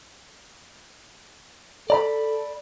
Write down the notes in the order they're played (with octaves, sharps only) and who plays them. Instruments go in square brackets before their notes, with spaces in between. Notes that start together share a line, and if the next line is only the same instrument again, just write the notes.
[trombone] A4 [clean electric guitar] D5 A#5 B5